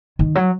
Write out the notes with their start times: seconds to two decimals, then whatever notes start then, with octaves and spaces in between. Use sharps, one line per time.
0.19 D#3
0.35 F#3